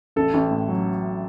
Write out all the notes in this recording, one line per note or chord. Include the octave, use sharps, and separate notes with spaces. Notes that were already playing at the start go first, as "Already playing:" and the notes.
A1 A4
A1
A2
F#3